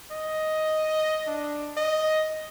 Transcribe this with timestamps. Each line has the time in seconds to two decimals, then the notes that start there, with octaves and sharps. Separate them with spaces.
0.11 D#5
1.27 D4
1.77 D#5